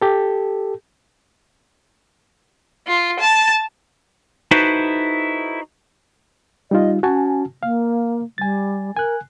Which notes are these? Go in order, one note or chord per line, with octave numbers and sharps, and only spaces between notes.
G4 A4
F4
A5
D#4 E4 F#4 A4 B4 C5
G3 D#4 F4 D#5
C#4 F#4 G#5 A5
A#3 F5
G3 G#5 A6
A#4 G#5 F#6